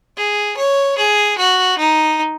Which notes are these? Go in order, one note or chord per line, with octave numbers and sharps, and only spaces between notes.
G#4
C#5
G#4
F#4
D#4